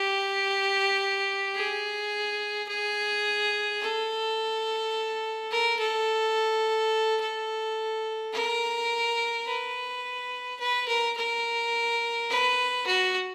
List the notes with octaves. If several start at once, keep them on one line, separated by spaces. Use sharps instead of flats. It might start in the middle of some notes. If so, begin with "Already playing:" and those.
Already playing: G4
G#4
G#4
A4
A#4
A4
A4
A#4
B4
B4
A#4
A#4
B4
F#4